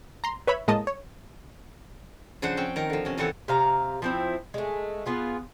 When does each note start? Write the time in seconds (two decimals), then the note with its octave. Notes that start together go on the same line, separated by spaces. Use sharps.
0.24 A#5 C6
0.47 B4 C#5 E5 B5
0.68 A2 G#3 A#3 D#5 A5 D#6
0.87 C#5
2.42 C#3 F3 D4 C5 F#5
2.57 C4 C#4 G5
2.76 D#3 A#4
2.90 D3 F3
3.05 C3 C#4
3.18 A#2 E3 C4 A4 C#5 F#5
3.48 C3 F5 A#5
4.02 F3 C4 E4
4.54 G#3 A3
5.06 B3 F4 G#4